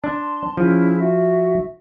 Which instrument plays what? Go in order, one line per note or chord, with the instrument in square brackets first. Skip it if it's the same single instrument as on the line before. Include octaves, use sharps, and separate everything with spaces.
[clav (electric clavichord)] D4 [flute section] A5 C6
[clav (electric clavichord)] F3 [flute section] C#4 E4 G#4
[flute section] F#4 E5